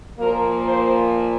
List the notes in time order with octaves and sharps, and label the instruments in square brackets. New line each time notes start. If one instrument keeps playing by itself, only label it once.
[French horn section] A#2 F3 A#3 A#4
C5